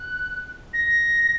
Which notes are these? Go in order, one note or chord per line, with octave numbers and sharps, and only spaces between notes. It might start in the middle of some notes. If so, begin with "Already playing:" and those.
Already playing: F#6
A#6